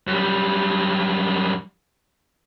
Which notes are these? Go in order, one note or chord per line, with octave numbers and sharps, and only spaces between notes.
F#2 G3